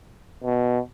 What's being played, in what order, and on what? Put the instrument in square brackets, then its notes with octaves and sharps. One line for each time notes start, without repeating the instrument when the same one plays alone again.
[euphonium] B2